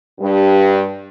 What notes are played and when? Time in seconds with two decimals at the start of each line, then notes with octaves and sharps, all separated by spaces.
0.20 G2